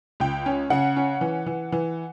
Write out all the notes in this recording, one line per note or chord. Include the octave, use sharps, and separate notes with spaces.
C#2 G5
C#4
C#3 F#5
C#4
E3
E3
E3